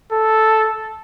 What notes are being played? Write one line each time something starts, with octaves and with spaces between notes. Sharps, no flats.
A4